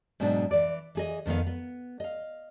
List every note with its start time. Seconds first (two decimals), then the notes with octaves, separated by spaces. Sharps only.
0.20 G#2 B2 F#3 C4 D4
0.51 E3 D5
0.95 E3 G#4 D#5
1.26 F2 D#3 B3 F5
1.47 B3
2.00 D#5 F5